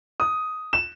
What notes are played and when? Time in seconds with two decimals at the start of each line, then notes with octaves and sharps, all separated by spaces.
0.20 D#6
0.73 E7